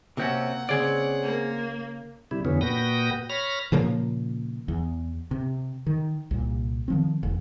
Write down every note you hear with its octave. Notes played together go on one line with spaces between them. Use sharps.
C3 A#3 C4 C#4 F#4 F#5
C#3 C4 C#4 G#4 D5
A#3
C3 G3 E4
F2 D3 E3 B3 C#4
A#2 F#4 B4 G5 D#6 A#6
C#5 B5 F6 A#6
A#2 C#3 F3 A#3
E2
C3
D#3
C2 A#2
D#3 F3 C4
F1 E2